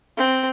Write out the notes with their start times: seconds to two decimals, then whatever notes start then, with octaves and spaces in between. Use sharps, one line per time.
0.18 C4